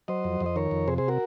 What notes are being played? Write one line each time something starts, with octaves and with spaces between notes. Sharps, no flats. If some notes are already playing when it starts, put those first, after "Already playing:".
F#3 C5 D#5
F2
F2
D#5
D#3 A#4 C#5
F2
C3 G#4 C5
G#4 C5
F#4 A#4